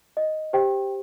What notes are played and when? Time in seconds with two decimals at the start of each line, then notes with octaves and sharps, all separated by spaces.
0.17 D#5
0.53 G4 C5 G5